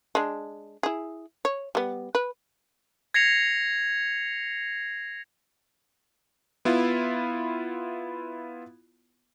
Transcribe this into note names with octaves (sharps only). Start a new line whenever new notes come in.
G#3 D4
E4 G#4
C#5
G3 B3
B4
G#6 A#6 C7 C#7 F7
B3 E4 F4